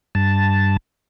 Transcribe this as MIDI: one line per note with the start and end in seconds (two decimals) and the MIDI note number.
0.15 0.77 43
0.15 0.77 81